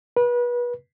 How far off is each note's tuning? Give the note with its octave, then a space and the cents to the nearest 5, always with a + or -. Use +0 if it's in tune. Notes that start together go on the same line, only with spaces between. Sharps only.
B4 -30